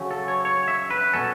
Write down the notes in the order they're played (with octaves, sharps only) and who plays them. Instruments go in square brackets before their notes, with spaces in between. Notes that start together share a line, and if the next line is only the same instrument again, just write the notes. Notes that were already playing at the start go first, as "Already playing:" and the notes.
Already playing: [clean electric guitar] C#3 F#3 A3 C#4
A4
C#5
C#5
E5
B4
B2 F#3 C#4 A4